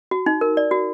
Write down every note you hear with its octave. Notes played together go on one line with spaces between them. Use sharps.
F#4
D#4
A#4
D5
F#4